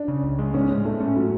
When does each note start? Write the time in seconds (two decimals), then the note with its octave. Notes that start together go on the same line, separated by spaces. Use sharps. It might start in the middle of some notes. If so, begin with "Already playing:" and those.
Already playing: D4
0.08 C#3
0.23 C#2
0.39 G#3
0.54 A2 C#4
0.70 G#3
0.85 A2 A3
1.00 C#4
1.16 A2 F#3